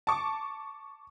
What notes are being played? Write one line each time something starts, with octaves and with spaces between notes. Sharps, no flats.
A5 C#6 D6